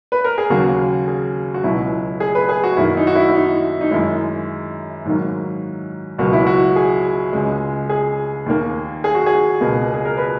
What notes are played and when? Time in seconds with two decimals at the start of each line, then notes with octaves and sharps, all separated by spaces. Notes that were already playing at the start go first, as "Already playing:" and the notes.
0.12 B4
0.24 A#4
0.38 G#4
0.50 D#2 C#3 F#3 A#3 F#4
1.07 G#4
1.54 F#4
1.63 C#2 B2 F#3 E4
2.20 G#4
2.35 B4
2.49 G#4
2.64 F#4
2.77 F#2 D#3 A#3 E4
2.97 D#4
3.07 F#4
3.15 E4
3.29 E4
3.34 D#4
3.81 D#4
3.91 F#2 D#3 G#3 E4
5.05 G#2 D#3 F#3 A#3
6.18 C#2 B2 F#3 A#3 F#4
6.33 E4
6.47 F#4
6.76 G#4
7.33 C#2 C#3 G#3
7.90 G#4
8.46 D#2 D#3 A#3
9.04 G#4
9.15 F#4
9.26 G#4
9.61 C#2 B2 A#3
9.94 G#4
10.05 A#4
10.17 B4